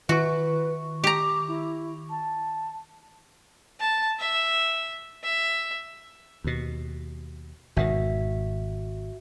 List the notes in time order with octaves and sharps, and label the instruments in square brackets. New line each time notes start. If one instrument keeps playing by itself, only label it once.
[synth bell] D#3 C#6 [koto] F#4 [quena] B4
[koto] G4 A#5 [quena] D6
[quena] E4
A5
[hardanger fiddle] A5
E5
E5
[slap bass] D#2 B2
[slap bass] G#1 B2 D#3 [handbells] F#4 E5